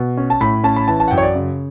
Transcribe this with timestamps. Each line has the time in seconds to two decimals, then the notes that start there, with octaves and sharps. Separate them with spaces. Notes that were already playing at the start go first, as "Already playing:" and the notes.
Already playing: B2
0.17 C#4
0.30 A5
0.41 A2 B5
0.64 C#4 A5
0.76 B5
0.88 E3 A5
1.00 A5
1.08 F#5
1.11 F#2 G5
1.18 C#5
1.23 D5
1.35 C#3